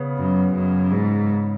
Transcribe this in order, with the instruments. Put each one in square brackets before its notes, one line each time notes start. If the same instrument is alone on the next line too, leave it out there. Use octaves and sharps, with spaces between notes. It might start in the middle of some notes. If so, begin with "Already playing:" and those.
Already playing: [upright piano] C#3 B3
[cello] F#2
F#2
G#2